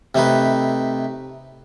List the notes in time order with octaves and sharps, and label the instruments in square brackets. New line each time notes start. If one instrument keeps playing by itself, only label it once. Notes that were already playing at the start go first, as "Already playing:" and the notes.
[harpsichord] C3 A3 D#4 B4